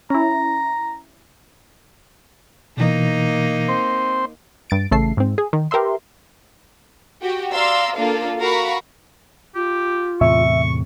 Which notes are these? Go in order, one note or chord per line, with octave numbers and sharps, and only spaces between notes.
C#4 E4 A#5
B2 E3 A#3 D#4
C4 C5
G2 A6 D7
A1 C#3 A3 A4 C7
G#2 C4
G#4
D#3
G4 A#4 B4 E5 C6
F#4 G4 G5
D5 F5 A#5 C6 E6
A#3 D4 F4 A4 F5
F#4 A#4 F5 A#5 B5 C#6
F4 G4
E2 A2 C3 E5 C#6